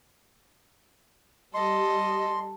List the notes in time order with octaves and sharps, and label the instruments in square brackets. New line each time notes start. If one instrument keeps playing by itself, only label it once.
[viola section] G3 [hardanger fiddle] A4 [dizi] D#5 [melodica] C6